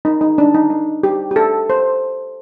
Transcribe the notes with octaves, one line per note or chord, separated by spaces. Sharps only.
D#4
D#4
D4
D#4
D#4
G4
G4
A4
C5